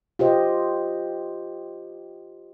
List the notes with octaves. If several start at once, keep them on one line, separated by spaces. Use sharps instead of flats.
F4 G4 C5 D#5